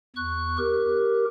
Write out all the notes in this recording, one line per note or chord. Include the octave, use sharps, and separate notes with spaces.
E2 C#6 F#6
G4 A#4